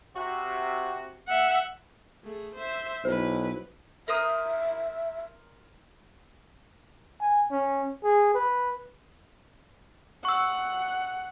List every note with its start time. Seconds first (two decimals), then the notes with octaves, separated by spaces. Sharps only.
0.15 C3 F#4
1.28 E5 F#5
2.24 A3 G#4
2.55 C5 E5
3.05 B1 E4 B4 C5
4.08 A#4 C5 E5 D#6
7.21 G#5
7.51 C#4
8.04 G#4
8.34 B4
10.25 F#5 C#6 E6